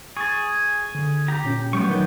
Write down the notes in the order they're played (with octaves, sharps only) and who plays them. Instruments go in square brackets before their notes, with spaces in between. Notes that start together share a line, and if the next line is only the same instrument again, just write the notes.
[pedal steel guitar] G#4 [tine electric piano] C#6 A6
[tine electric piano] D3
[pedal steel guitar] G4 A#5
[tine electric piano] A#2 C#4
[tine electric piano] F#3 G3 A3 [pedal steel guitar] B3 G4 C#6
[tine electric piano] D#3 F#3 G6